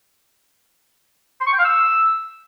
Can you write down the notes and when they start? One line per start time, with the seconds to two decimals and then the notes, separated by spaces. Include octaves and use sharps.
1.41 C6
1.47 C#6
1.53 G5
1.59 F5
1.65 E6